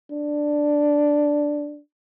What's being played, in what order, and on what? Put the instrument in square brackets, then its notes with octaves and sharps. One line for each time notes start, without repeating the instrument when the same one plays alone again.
[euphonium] D4